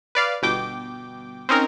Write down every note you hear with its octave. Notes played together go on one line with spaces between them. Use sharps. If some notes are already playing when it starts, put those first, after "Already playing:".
B4 D5 F5
G1 B2 G5 D6
C4 C#4 D#4 A#4